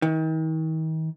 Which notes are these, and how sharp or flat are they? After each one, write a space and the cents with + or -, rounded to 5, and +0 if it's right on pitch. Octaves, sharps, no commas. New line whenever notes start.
D#3 +40